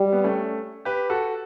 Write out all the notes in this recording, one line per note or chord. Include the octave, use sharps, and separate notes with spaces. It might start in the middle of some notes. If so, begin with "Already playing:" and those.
Already playing: G3
B3
A3 C#4
G4 B4
F#4 A4